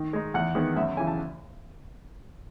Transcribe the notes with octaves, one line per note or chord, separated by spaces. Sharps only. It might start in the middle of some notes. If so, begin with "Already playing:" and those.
Already playing: D#3
G#3 D#4
E2 F#5
D#3 G#3 B3
F#2 E5
C#3 E3 G#5
A5